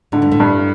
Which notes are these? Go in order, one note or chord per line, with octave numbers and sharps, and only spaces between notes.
A2 D3
G2
A2
G2